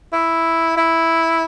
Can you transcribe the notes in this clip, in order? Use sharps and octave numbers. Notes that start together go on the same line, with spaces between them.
E4
E4